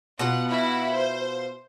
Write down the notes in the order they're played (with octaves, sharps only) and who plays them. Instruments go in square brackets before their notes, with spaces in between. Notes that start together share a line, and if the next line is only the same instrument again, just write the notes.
[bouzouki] B2 B3 F4 [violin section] F#5
[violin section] E4 F#4 B5
C5